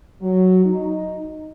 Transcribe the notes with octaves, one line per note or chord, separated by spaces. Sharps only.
F#3
D#4